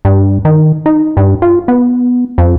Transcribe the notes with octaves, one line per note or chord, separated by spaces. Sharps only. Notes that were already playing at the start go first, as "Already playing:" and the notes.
G2
D#3
D#4
G2
F4
B3
F2